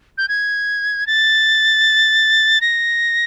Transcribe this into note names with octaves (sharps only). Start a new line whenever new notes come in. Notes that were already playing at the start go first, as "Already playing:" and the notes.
G6
G#6
A6
A#6